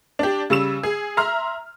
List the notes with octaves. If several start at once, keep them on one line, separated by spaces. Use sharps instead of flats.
D4 G4
C#3 G3 E6 E7
G#4
E5 A#5 C6 F6